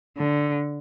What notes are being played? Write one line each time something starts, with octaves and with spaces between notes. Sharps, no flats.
D3